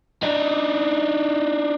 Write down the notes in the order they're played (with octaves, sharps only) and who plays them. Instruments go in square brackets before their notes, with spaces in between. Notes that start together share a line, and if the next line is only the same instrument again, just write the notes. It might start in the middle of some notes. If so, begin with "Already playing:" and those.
[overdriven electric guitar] D4 D#4